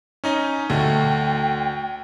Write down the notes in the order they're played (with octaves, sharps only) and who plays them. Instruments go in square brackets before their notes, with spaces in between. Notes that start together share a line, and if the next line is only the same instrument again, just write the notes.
[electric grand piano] C#4 D#4 D#5
[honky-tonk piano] D2 [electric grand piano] A3 [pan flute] G5